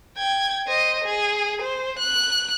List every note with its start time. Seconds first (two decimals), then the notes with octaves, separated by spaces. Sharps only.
0.17 G5 G#6
0.67 C5 D#5
1.04 G#4
1.62 C5
1.99 F#6